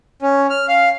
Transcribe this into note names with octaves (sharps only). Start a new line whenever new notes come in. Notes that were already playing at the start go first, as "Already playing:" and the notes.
C#4
F6
F5